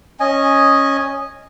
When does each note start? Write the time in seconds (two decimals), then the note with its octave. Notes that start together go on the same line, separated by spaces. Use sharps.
0.20 C#4 D#5 G#5